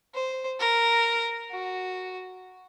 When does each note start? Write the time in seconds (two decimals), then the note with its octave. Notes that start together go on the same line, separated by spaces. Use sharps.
0.15 C5
0.60 A#4
1.52 F#4